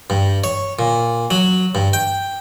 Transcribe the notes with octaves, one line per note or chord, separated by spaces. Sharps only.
G2
C#5
A#2
F#3
G2
G5